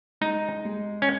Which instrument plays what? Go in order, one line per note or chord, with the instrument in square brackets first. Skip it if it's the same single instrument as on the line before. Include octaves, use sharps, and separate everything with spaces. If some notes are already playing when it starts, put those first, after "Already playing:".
[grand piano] G#3 [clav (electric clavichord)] D#4
[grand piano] G#3
[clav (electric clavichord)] C#4